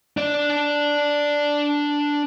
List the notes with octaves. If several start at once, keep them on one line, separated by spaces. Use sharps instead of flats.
D4 D5